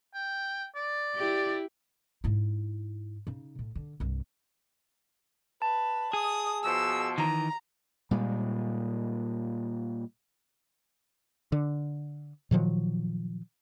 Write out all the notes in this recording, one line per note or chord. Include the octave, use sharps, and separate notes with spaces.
G5
D5
E4 G4
G#2 E4
C#3 D#4
A2
D3
C2 G2
B4 A5
G#4 D#6
B2 F3 E6
D#3 E3 A#5
A#2 G3 G#3
D3
A#2 D#3 F3 F#3